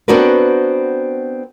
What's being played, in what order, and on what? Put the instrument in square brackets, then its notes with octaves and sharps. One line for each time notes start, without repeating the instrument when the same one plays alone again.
[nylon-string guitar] B3 C4 D4 F#4 A#4 B4